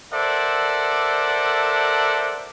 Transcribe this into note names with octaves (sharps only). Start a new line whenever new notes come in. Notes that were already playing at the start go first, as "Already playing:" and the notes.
A4 A#4 C5 D5 E5 F#5